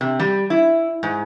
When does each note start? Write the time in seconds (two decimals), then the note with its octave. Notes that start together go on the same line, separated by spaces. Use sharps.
0.01 C3
0.20 G3
0.50 E4
1.03 G#2